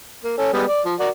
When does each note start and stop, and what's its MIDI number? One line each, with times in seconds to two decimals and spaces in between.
0.24 0.33 58
0.38 0.50 61
0.38 0.50 69
0.53 0.64 55
0.53 0.64 56
0.53 0.64 59
0.68 0.82 74
0.85 0.94 53
1.00 1.09 66
1.00 1.09 70
1.00 1.09 74